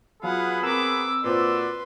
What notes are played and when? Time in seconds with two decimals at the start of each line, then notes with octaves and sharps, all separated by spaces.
0.23 F#3 B3 F4 G#4 F5 F#5 B5
0.63 C4 A#4 A#5 D6 E6
1.24 A#2 F#4 B4 C5 D5 C6